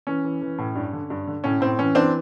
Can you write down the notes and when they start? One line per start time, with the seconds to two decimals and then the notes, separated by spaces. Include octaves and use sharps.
0.07 E3 C#4
0.24 E3
0.42 E3
0.59 A2
0.76 G2
0.93 D3
1.10 G2
1.28 D3
1.44 A2 C#4
1.61 A2 C4
1.79 E3 C#4
1.95 E3 C4 D4